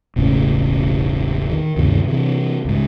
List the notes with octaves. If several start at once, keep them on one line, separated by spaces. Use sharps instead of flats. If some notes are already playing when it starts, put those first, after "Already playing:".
E1 A1 A2 C#3
D#3
D2 G2 C3 D#3
C3 E3
C#2 G#2